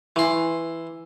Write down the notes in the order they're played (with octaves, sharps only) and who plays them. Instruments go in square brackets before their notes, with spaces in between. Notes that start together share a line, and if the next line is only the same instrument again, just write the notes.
[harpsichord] E3 C6 [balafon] E4